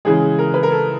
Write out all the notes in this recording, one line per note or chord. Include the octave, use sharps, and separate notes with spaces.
C#3 E3 G#3 G#4
A#4
B4
A#4
A4